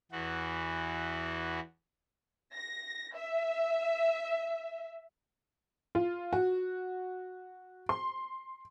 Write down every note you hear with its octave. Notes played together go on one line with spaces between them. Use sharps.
E2 E3 F#4
A#6
E5
F4
F#4
C6